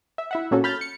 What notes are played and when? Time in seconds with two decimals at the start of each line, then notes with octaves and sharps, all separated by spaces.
0.18 E5
0.31 E4 E5 F#5
0.51 A#2 A#3 C#4 F#4 A4
0.64 B5 F6 G6 A6
0.81 C#7